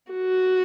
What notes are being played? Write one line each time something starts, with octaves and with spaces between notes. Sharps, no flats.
F#4